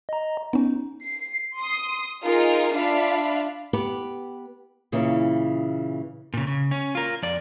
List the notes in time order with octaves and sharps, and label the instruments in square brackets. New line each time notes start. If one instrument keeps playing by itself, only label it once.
[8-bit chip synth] D#5 A#5
[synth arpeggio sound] B3 C#4 [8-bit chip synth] D#4
[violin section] C7
C6 D#6
D#4 F4 G#4 A#4 D#5
D4 F4 E5 F5 B5
[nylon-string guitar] B3 G4 B4
A#2 C#3 E3
[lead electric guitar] A#2 C#3
C#3
C#4
F4 A#4
F2 D5